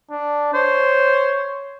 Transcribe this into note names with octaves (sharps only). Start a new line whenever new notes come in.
D4
C5 C#5